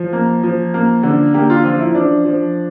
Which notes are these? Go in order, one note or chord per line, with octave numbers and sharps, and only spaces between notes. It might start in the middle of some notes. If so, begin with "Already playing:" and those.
Already playing: F3
A#3
F3
A#3
D3
A#3 G4
F4
F3 F4
E4
F3 D4
F3